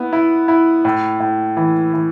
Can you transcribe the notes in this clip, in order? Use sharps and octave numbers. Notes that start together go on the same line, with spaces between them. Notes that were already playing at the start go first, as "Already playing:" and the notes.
Already playing: B3 E4
E4
E4
A2
A2
E3
E3